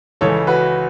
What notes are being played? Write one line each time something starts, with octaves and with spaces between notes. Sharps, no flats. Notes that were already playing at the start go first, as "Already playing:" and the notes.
C#2 C#3 E3 A4 C#5
F#4 B4